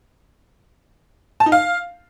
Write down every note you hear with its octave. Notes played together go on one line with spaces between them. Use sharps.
A5
D#4
F5